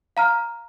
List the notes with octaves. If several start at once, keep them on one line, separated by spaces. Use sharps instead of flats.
F5 A#5 F6